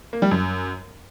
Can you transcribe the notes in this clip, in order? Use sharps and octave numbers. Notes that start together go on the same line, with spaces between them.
A#3
G3
F#2